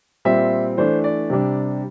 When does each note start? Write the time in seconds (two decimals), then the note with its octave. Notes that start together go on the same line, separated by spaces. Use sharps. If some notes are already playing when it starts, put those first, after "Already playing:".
0.25 A#2 G3 C4 E5
0.77 E3 A3 D4 C5
1.04 D5
1.30 C3 G3 D4